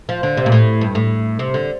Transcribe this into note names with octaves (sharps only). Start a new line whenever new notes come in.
F3
D3
C3
A#2
A2
G2
A2
C3
D3